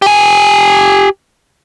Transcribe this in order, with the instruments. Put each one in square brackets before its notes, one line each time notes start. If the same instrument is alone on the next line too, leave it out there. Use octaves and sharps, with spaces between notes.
[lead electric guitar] G4 G#5